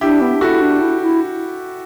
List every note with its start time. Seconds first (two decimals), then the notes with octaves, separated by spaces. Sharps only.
0.01 D4 E4 G4
0.21 B3
0.36 D4
0.41 E4 F#4 A4
0.61 D4
0.81 E4
1.02 E4